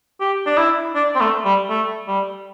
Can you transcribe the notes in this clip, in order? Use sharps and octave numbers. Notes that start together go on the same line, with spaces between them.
G4
D4
E4
D4
C4
A3
G3
A3
G3